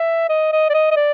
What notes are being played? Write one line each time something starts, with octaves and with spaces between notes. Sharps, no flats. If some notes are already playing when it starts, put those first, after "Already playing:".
Already playing: E5
D#5
D#5
D5
D#5
D#5
D5